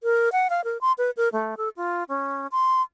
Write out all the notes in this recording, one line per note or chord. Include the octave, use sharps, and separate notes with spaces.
A#4
F#5
F5
A#4
C6
B4
A#4
A3
A4
F4
C#4
C6